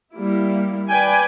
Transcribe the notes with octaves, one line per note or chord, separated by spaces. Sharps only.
G3 A#3 E4
B4 D5 G5 G#5